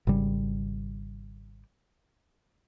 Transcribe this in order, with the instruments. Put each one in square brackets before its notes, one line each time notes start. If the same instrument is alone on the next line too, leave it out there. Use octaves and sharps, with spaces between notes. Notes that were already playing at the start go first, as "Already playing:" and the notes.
[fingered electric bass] G#1 C#3 G3